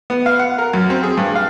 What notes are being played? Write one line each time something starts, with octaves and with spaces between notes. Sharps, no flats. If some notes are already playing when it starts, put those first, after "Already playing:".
B3
F5
F#5
A#4
F#2
C4
G#4
G2
F5